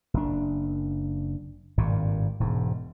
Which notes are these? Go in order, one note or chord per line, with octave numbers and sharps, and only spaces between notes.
F#1 D4
G#1 G2 A#2
E1 G#2